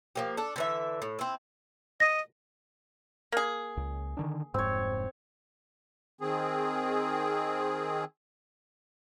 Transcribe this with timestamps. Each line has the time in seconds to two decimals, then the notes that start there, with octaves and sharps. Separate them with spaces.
0.15 F3 A#3 G4
0.37 D4 A4
0.56 D3 E3 E5
1.02 A2
1.19 C4 E4
2.00 D#5 A#6
3.32 A#3 G#4
3.77 C#2
4.17 D3 D#3 D4
4.54 F1 G#2 C4 C#5
6.21 D#3 C4 G#4